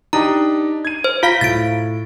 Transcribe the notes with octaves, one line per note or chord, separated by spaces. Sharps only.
D4 D#4 G4 A#5
G#6 D#7
C5
F4 F5 B5 B6
A2 A6 D7